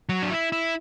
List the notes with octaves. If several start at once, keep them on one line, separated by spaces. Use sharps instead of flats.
F#3
D4
E4
E4